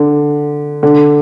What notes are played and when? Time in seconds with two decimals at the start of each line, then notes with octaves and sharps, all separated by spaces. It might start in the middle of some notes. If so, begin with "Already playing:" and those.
Already playing: D3
0.83 D3